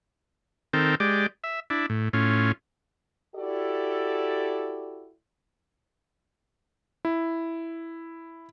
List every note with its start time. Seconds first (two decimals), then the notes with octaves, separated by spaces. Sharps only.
0.73 D#3 C4 A4 A#4 G5
1.00 G#3 G4 D5
1.44 E5
1.70 D4 E4
1.90 A2
2.13 A2 C#4 F4
3.36 E4 F#4 G4 A4 D5
7.05 E4